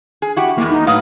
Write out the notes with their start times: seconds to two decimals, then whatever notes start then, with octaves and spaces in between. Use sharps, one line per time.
0.22 G#4
0.36 E4 F#4 G4
0.58 E2 G#3 A#3 E4
0.69 D#4
0.87 A2 F#3 B4 F5 D#6